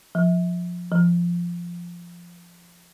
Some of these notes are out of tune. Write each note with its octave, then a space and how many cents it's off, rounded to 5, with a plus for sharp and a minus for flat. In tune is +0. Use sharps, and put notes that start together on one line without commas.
F3 +15
F3 -10